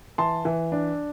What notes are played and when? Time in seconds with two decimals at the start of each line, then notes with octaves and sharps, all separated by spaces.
0.18 E3 A5 C6
0.45 E3
0.72 D4